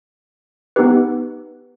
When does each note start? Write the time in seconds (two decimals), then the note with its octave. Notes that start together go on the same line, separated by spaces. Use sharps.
0.76 B3 D#4 G4 B4